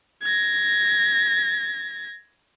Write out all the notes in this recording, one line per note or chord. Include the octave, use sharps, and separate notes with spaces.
G#6 A#6